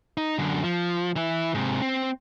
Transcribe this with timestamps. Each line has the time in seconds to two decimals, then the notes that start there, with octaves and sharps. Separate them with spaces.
0.17 D#4
0.38 F#2 D3
0.64 F3
1.16 E3 E4
1.54 G#2 C3
1.82 C4